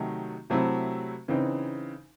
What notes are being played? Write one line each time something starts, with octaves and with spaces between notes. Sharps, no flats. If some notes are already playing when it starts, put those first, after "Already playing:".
Already playing: C3 D#3 F#3 A3 D#4
C3 F#3 A3 C4 E4
C#3 E3 C4 D#4